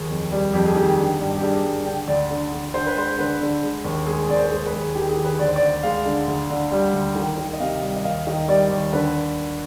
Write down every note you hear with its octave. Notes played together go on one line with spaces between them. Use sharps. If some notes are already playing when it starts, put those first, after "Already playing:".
Already playing: D#2 G#4
F2
G3
F2 G4
G#4
D#3 G4
D3
G2
G4
G2 G#4
G2
D3 G5
D2 D5
D3
D3
D3 C5
B4
G#3 C5
D3 B4
D3
G#3
D#2
G#3 G#4
D#2 D5
C5
B4
G#3 G#4
B4
D#2 G#4
D#3 G4
G#4
D#3
B4
D2 D5
C5
D5
D2
G#3 F5
D3
D2
D3
G3
D2
D#3
D#3
D#5
C3 F5
G3
D#5
D#2 F5
D#3 D#5
G3 D5
D#2
D3 B4